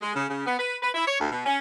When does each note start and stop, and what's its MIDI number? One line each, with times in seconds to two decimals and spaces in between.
0.02 0.14 56
0.15 0.25 49
0.29 0.44 49
0.46 0.55 59
0.59 0.76 71
0.82 0.90 71
0.94 1.04 64
1.07 1.16 73
1.20 1.29 38
1.32 1.44 47
1.46 1.58 61